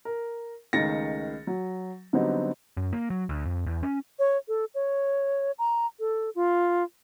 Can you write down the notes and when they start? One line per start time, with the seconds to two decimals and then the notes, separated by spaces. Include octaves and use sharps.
0.05 A#4
0.73 C#2 D#3 A3 A6 A#6 C#7
1.47 F#3
2.13 D3 F#3 G3 B3 C4 D#4
2.77 F#2
2.93 A#3
3.10 F#3
3.29 D2
3.46 F2
3.67 E2
3.83 C#4
4.19 C#5
4.48 A4
4.75 C#5
5.59 A#5
6.00 A4
6.35 F4